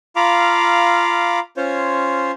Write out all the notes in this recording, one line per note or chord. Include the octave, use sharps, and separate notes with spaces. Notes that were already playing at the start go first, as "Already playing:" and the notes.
F4 F5 A#5 B5 D6
C#4 F4 C5 C#5